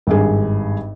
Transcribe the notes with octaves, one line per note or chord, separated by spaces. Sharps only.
G#1 G2 G#4